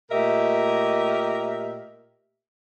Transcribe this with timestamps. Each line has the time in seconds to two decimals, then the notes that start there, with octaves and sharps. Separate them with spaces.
0.11 A#2 A3 G4 A#4 D#5 E5